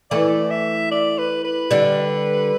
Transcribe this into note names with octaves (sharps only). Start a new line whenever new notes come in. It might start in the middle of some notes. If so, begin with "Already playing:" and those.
E3 A3 D5
E5
D5
B4
B4
D3 G3